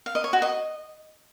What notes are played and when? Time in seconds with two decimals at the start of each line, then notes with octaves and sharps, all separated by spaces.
0.06 F5
0.15 D#5
0.24 C#5
0.33 F#4
0.42 D#5